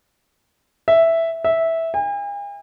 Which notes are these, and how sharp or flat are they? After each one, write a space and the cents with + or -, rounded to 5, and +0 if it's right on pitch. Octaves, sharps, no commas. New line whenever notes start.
E5 +0
E5 -10
G#5 -45